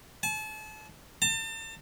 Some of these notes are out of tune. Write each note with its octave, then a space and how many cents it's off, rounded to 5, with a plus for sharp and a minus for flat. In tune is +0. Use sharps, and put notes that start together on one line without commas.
A5 -35
A5 +35